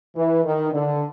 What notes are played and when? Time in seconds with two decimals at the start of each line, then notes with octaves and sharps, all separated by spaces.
0.17 E3
0.45 D#3
0.73 D3